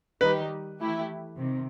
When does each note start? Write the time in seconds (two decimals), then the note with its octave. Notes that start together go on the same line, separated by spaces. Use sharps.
0.21 D#3 G3 D#4 G4 B4
0.80 E3 A3 E4 G4
1.38 C3 D#3